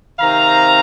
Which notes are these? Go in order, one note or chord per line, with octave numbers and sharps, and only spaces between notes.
C3 D#3 C4 D#4 F5 A#5